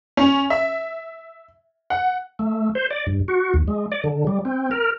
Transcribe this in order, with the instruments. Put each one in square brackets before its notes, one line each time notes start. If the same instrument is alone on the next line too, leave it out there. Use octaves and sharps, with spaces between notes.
[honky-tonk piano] C#4
E5
F#5
[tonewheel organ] A3
C5
D5
G2
F#4
D#2
G#3
D5
D3
G3
C4
A#4